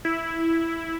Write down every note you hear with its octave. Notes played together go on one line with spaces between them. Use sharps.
E4